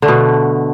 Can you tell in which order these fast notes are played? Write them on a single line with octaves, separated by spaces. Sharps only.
D3 A3 B2